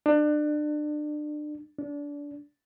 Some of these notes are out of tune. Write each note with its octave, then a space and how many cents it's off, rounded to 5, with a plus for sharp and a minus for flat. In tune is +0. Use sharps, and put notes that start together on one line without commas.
D4 +30
D4 -25